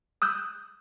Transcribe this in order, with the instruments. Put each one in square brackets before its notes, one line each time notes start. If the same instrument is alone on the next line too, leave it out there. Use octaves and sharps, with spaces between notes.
[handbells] D#6 E6 F#6 G6